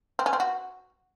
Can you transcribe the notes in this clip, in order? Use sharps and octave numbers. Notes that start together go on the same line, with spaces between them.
C4
C#4
C4
F#4